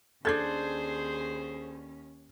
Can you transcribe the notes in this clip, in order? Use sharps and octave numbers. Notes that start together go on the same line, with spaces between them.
D#2 C#4 D4 G#4 A4 C5 G6 G#6